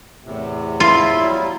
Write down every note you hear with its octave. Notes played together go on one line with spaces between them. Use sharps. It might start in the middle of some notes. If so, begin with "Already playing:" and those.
E2 A2 C3
E4 F4
F#3 G3